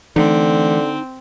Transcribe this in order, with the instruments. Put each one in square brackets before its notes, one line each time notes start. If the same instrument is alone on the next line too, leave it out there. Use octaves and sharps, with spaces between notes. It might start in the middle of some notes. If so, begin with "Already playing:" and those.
[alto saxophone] D3 [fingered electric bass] E3 A3 [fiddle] C4 [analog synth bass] D#4